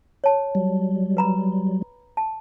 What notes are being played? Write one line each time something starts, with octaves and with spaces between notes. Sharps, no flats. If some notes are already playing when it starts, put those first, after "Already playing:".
C#5 A5
F#3 G3
B4 A#5 B5
A5